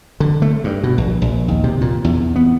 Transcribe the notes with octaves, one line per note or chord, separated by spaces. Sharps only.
D3
A3
G2
B2
A#1
A#1
D#2
C3
A#2
E2
B3